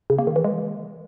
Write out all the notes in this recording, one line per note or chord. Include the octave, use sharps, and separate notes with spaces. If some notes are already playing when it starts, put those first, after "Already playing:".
C#3
A#3
D#3
E3
G#3